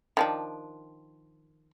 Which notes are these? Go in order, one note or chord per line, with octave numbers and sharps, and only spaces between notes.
D#3 F3 D4